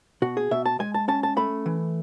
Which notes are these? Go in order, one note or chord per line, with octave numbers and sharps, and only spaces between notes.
B2 F#4
G#4
B2 E5
A5
G#3 G#5
A5
C#4 A5
A5
A3 B5
E3